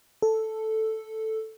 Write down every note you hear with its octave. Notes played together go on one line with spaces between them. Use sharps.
A4